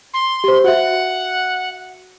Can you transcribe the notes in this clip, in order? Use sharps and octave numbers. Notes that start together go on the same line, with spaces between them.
C6
G4 C5
F#4 E5 F#5